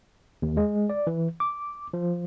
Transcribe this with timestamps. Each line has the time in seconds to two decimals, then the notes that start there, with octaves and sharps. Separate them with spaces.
0.42 D#2
0.57 G#3
0.90 D5
1.07 E3
1.40 D6
1.93 F3